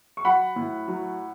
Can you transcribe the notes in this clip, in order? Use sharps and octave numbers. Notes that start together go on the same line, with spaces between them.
C#6
F#3 F#5 B5
A2
F#3